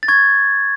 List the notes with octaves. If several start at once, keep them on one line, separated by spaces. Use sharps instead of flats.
A6
C#6 G#6